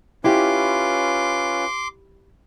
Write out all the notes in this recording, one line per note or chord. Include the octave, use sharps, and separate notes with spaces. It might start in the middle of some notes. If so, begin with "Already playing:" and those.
C#4 E4 F4 G4 B4 C6 D6